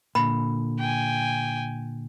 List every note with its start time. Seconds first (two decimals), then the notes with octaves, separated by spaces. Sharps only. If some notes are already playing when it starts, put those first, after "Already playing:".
0.15 A#2 D3 B5
0.79 G5 G#5